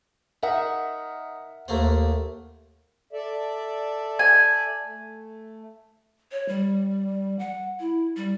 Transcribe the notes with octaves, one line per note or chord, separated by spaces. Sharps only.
D#4 A#4 E5 F#5
D#2 A3 A#3 C5
A4 D5 E5
G#5
A3
C#5
G3
F#5
E4
G3